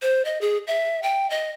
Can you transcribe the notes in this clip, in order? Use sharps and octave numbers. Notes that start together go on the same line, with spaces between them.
C5
D#5
G#4
E5
G5
D#5